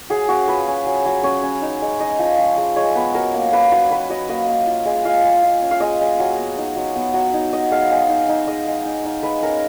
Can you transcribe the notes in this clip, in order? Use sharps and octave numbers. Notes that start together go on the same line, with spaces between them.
F#3 G#4
C#4 F#4
F4 B4
C#4
F#3
F#3
C#4 C#5
C#4
D#4
G#3
D#4 D#5
F3
F3
G#3
G#3 C#5
B3 B4
F#3 A#4
A#3
A#3 B4
F#3 B4
F#3 B4
F#3 D#5
A#3 D#5
A#3
F4
G#3
F4 F5
G#3
F4
C#4
F5
G#3 D#5
G#3
F#3
B3
D#4
F#3
B3
F#3
D#4
F#3 D#5
G#3 F5
G#3
D#4
D#4
G#3 D#5
G#3
D#4
D#4
G#3 B4
C#4 A#4